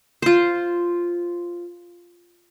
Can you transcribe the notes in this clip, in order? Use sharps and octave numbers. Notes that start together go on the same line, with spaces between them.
F4 C5